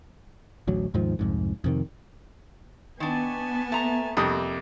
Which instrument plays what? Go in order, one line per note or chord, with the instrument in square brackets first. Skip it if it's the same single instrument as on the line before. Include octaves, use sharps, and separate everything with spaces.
[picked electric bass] A1 D2 F#3
D#2 G#2 D#3 F3
C2 F2 G#2
F2 C3 D#3
[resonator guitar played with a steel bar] D#3 D4 [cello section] B3 [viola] G#5 A5
[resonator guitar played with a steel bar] A3 A#5
[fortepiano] F2 C3 D#6 [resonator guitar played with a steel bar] G3 [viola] A#3 D6